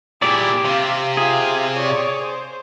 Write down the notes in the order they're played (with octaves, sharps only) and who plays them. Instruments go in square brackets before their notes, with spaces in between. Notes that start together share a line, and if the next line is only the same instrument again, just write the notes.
[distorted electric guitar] A#2 E4 [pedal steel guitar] G4 D5 [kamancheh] G#4
[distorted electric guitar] C3 [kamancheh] F5
[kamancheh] F4 F5 [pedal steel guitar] G#4
[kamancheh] C#5 D5
C5